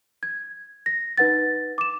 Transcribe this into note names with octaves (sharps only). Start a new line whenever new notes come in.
G#6
A#6
D#4 B4 F#5 A6
D6 E7